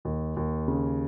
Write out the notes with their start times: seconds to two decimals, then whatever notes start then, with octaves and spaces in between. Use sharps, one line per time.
0.05 D#2
0.36 D#2
0.68 C#3